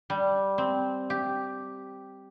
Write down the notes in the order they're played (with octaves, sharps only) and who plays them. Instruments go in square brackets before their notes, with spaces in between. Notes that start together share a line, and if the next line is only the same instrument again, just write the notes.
[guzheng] G3
C4
G4